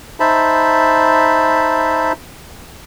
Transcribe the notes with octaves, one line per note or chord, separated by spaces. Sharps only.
D#4 C5 E5 A5 B5